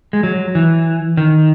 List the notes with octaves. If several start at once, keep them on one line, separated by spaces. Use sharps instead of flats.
G#3
F#3
E3
D#3